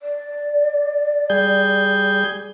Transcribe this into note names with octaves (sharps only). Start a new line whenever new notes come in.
D5
G3 G#4 G6